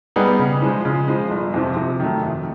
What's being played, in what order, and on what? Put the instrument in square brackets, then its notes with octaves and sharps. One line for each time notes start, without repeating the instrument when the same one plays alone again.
[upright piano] G3 B3 D#4 G#4
C#3
F3 G#3
C#3
F3 G#3
G1
F2 C3 F3
C3
D#3 F#3 A3
F2